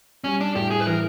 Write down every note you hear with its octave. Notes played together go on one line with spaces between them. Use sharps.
G3 C#4
D4
A2 G4
G#4
B4
E3 A#4